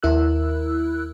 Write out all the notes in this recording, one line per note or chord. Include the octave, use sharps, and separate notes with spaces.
D#2 E4 A#4 E6 F#6